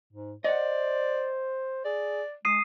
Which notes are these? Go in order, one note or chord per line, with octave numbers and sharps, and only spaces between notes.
G#2
C5 D5 D#5 F#5
G#4 D5
G#3 D#6 C7 D#7